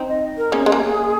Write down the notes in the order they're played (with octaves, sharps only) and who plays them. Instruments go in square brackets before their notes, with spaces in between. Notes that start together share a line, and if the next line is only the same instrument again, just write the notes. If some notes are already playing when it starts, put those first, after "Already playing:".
Already playing: [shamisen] C4 D#4
[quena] D#5
A#4
[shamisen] A#3 C#4 [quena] G#4
[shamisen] G#3
A#3